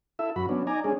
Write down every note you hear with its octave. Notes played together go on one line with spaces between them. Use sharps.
E4 A4 E5
F#2 F#4 B5
F#3 B3 C#4 D4
D#4 D5 G#5 A#5
G#3 C#4 D4 G#4